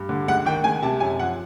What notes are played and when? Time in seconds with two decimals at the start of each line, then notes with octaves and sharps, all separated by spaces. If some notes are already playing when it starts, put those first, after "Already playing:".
Already playing: G2
0.09 D3
0.28 C#2 F#5
0.46 D#3 G5
0.64 C#2 G#5
0.82 C3 A5
1.00 F#2 G#5
1.19 F3 F#5